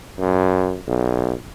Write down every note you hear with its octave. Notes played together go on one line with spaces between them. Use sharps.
F#2
B1